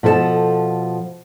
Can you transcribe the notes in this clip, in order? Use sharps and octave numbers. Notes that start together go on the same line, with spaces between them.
B2 F3 A4 A#4 A5